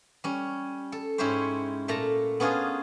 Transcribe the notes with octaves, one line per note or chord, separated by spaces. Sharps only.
G3 C#4
A4
G#2 C#4 E4 G4 C5 C#5
A#2 A3 A5 A#5
B3 C#4 D4 F4 G#4